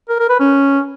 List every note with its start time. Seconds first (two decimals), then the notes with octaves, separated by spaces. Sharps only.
0.09 A#4
0.19 A#4
0.30 B4
0.40 C#4